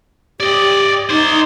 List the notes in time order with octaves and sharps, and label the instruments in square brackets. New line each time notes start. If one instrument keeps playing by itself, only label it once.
[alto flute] G4 [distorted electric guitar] D5 D#5
[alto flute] D#4 [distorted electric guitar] C5 D5